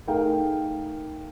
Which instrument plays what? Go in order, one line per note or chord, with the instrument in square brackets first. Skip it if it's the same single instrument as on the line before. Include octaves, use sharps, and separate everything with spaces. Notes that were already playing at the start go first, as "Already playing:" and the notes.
[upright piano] A3 D#4 G#4 A#4 F5 G5